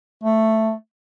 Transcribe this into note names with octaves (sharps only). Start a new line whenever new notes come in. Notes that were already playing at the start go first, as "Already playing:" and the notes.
A3